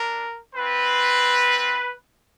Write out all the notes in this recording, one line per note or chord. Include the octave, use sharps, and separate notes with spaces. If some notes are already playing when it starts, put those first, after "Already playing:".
Already playing: D4 A#4
C4 F4 B4